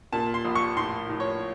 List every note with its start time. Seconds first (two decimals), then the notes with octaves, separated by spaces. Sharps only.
0.13 A#2 A5
0.34 C6
0.45 A#1
0.55 C#6
0.77 A2 C6
1.09 A2
1.20 C#5